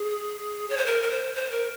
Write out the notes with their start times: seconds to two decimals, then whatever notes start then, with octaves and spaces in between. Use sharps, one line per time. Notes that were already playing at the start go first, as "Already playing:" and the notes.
Already playing: G#4
0.70 C#5
0.77 C5
0.86 A#4
1.03 A#4
1.11 C5
1.36 C5
1.51 A#4